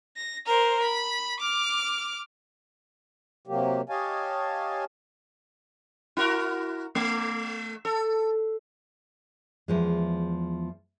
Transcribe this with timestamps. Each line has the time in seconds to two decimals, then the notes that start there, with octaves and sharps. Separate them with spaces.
0.17 A#6
0.46 A#4 C5
0.82 B5
1.40 D6 F6
3.47 C3 F#3 A#3 G4
3.89 G4 C#5 D#5 F5 G#5 A5
6.17 E4 F#4 A#4
6.95 A3
7.85 A4
9.68 E2 F3 G#3